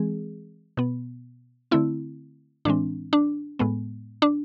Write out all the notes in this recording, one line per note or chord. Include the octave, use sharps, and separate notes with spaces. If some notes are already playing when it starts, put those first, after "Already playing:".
Already playing: E3 G#3 C4 G#4
B2 B3
D3 A3 C4 E4
A2 E3 G#3 C4 D4
D4
A2 G#3 B3
D4